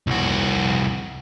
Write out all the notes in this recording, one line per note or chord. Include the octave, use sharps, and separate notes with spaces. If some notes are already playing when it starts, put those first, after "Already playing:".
C2 F#4